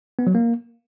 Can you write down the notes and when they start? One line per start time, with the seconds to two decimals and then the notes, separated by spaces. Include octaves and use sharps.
0.19 B3
0.27 F#3
0.35 A#3